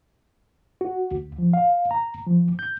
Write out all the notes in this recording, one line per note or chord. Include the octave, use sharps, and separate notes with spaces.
F#4
D2
F3
F5
A#5
F3
G6